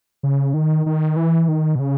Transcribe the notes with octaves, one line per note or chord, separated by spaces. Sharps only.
C#3
D#3
D#3
E3
D#3
B2
C#3